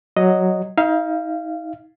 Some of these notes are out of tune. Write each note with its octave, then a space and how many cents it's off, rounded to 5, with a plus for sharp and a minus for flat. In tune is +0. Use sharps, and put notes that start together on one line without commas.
F#3 +0 D#5 +0
D#4 +35 F5 -15